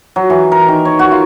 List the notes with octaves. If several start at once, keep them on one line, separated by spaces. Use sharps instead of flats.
F#3
E3
A#4
D#3
C#5
F#4
F4